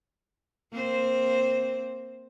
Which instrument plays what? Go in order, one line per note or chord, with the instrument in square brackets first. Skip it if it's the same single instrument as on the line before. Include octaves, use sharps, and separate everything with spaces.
[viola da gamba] A#3 C4 C5